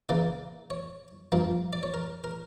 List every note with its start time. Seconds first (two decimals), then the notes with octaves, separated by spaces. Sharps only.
0.09 C#3 E3 A#3 D5
0.70 C#5
1.32 G2 F3 A#3
1.73 D5
1.83 C#5
1.94 A#4
2.24 A#4